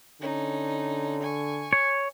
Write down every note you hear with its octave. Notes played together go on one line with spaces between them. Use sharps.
D3 C#4 D#4
G#5 C#6
C#5